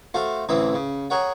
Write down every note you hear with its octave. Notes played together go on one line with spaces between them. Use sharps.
A3 F#4 C5 F5
A1 D2 E3 C4 E5 D#6
C#3
G#4 A#4 C#5 F#5 G5